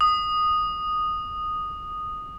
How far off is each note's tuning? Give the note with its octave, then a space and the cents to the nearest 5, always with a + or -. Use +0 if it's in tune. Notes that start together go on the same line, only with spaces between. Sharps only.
D#6 -10